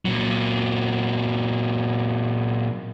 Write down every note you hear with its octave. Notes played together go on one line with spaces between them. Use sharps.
A#2 F#3